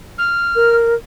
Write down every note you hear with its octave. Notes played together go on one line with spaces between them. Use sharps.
F6
A#4